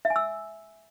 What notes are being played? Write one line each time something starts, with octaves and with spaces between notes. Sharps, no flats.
E5
G#5
E6